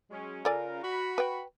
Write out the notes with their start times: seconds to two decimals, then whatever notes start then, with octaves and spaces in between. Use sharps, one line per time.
0.10 F#3 G#3 C#4
0.45 C#3 F4 A4 A#4 D5 G#5
0.84 F#4 B5
1.18 B4 G5